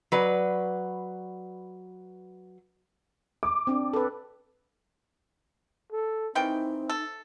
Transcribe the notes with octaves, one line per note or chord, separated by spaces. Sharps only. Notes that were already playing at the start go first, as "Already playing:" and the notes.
F#3 B4 D5
D6
C4 D4
A4 B4
A4
D#3 E3 C4 D#4 G5
A4